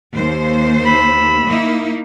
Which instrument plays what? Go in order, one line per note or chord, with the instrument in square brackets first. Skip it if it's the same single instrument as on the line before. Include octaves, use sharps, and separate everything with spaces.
[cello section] D#2 C5
[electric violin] B5 E6
[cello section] A#3 D#4 E4